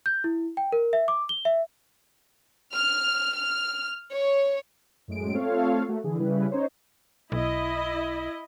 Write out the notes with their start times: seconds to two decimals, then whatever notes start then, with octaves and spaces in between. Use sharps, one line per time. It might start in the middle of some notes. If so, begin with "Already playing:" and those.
0.06 G6
0.24 E4
0.57 G5
0.72 A#4
0.93 E5
1.08 D6
1.29 G7
1.45 E5
2.75 F6
3.34 F6
4.12 C#5
5.08 F#2 A2 G#3 D7
5.33 A3 C4 F4 A4 C#5 F5
5.88 A3 A#3 F#4
6.04 D3 E3 G#4
6.19 C#3 G3 E4 B4
6.51 C#4 D#4 C5 C#5
7.32 B1 E4 D#5